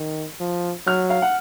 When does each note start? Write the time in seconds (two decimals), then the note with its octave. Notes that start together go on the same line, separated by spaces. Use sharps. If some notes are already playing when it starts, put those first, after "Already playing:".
Already playing: D#3
0.40 F3
0.87 F#3 F6
1.10 F5
1.22 F#5